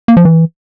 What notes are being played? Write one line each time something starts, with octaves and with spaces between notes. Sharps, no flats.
A#3
F3
E3